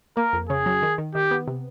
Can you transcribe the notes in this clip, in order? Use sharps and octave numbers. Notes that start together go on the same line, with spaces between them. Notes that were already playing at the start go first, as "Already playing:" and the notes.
A#3 A#4
F2
C#3 G#4
F#3
D#3
D#3
D#3 G4
B3
C3